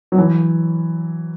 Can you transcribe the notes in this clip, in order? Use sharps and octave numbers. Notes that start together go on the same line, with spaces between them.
F#3
E3